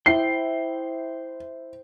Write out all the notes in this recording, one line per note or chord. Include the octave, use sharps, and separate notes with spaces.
E4 C5 G5 C7